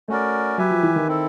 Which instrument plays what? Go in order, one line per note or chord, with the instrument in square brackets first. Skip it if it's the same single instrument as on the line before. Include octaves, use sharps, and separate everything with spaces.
[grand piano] A3 [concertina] C#4 F#4 A#4 D5
[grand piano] F#3 [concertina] G4 B4 E5 G#5
[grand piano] F3
E3
D#3
[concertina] C4 E4 A4